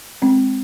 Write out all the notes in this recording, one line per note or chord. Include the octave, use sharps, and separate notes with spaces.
G#3 C4